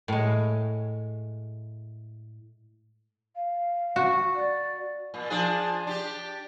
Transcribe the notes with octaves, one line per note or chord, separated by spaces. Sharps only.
A2 G#3
F5
F#4
D5
A#2
F3 D4 G#4
D4 G4